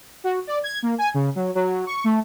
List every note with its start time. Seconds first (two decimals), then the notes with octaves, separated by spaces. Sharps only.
0.24 F#4
0.47 D5
0.64 G#6
0.83 A#3
0.98 G#5
1.14 C#3
1.35 F#3
1.55 F#3
1.87 C#6
2.04 A3